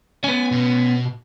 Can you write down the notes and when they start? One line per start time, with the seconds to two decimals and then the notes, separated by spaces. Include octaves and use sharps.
0.24 B3 C#4 G#5
0.51 B2